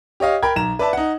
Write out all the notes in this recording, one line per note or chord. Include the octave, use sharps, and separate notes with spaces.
G4 C#5 D#5 F5
A#4 G5 B5 G#6
B1 A#5 E7
B4 D5 E5 A5
D#4 F#5